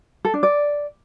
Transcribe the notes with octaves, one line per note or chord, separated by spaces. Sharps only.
A4
D4
D5